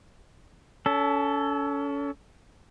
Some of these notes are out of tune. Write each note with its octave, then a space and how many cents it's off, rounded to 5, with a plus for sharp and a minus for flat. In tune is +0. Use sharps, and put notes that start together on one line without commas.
C#4 +30 A4 +0